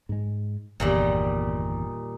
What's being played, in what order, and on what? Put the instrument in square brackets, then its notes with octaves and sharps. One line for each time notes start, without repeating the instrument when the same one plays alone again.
[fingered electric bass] G#2 G#3
[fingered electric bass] G1 E2 [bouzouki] A#2 D#3 G3